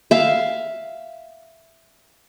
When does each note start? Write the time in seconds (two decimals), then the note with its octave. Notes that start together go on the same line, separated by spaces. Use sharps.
0.11 E5 F5